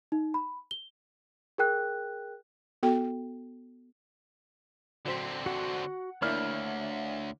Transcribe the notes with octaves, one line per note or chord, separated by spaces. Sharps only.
D#4
B5
G7
G#4 A#4 G5 F#6
B3 F#4 A4 G5
D3 F#3 C4 C5 B6
F#4 F#5
D2 A#3 D4 E4 C#5 B5 F6